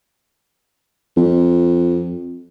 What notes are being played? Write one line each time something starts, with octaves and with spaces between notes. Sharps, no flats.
F2